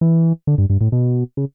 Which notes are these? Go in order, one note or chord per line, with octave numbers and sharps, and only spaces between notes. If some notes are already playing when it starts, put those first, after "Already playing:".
E3
D3
G2
G2
A2
B2
C#3